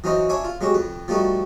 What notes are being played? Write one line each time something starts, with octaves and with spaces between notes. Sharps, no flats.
E3 F#3 C#4 D#4 C5 D#5
D4 C#5 E5 G#5 B5
F4
F#3 G#3 C#4 F#4 G4
F2 B4
F3 G3 A3 D#4 F#4